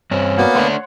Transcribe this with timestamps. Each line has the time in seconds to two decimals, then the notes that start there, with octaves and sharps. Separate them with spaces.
0.11 G2 C4 C#4
0.38 A#3 B3 F#4 D5
0.55 A3 D4 C#5 F#5 C6